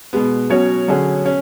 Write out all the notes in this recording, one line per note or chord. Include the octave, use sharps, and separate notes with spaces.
B2 G#3 B3
B2 F#3 C#4 F#4 C#5
D3 F#3 C#4 G#4
C#4